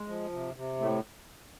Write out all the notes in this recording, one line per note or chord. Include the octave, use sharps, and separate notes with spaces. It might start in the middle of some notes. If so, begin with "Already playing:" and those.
Already playing: G#3
F3
C3
C3
A2 A3